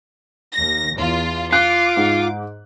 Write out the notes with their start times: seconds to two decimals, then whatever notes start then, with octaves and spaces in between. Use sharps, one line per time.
0.53 D#2 A#6
0.96 E2 F4
1.53 F4 D6 F#6
1.97 G#2